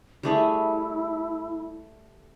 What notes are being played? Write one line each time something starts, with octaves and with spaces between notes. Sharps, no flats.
G3 A3 E4 G#4